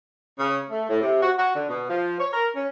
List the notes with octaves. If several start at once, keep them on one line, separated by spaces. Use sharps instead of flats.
C#3
A3
A2
C3
F#4
F#4
D3
B2
F3
C#5
A#4
C#4